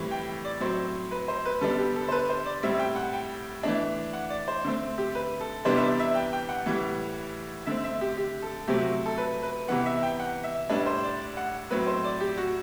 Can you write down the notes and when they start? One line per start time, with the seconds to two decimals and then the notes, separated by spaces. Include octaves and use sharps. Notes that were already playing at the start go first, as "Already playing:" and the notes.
Already playing: A2 E3 G3 C4
0.11 G5
0.45 D5
0.60 A2 F#3 C4 C5
1.11 B4
1.28 C5
1.45 B4
1.61 D3 G3 B3 D4 A4
1.79 G4
1.96 A4
2.08 C5
2.12 B4
2.30 C5
2.46 D5
2.63 A2 G3 C4 E5
2.79 G5
2.96 F#5
3.13 G5
3.63 E3 A3 D4
4.13 F#5
4.30 D5
4.48 C5
4.64 D3 A3 C4
4.98 G4
5.15 B4
5.41 A4
5.65 C3 E3 G3 B3 D4 C5
5.77 E5
5.82 D5
5.99 E5
6.15 G5
6.33 G5
6.49 F#5
6.66 A2 E3 G3
7.66 D3 A3 C4 E5
7.84 E5
8.01 G4
8.17 G4
8.42 A4
8.68 C3 F#3 A3 C4 G4
8.80 F#4
9.06 A4
9.18 B4
9.43 B4
9.68 C3 E3 B3 F#5
9.86 E5
10.03 G5
10.20 F#5
10.44 E5
10.70 A2 G3 D4 B4
10.86 C5
11.03 D5
11.37 F#5
11.70 A2 F#3 C4 B4
11.87 C5
12.04 D5
12.21 G4
12.38 F#4